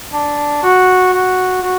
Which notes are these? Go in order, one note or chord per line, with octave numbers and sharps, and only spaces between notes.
D4
F#4
F#4
F#4